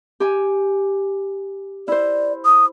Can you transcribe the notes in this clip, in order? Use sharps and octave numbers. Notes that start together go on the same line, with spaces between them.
G4 G#5
E4 C5 D5
D#6